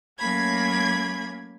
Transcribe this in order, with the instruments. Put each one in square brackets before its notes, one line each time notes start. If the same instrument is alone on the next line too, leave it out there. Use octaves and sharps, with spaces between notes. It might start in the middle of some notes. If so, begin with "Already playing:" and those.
[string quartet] F#3 A3 A#3 C#4 B5 G#6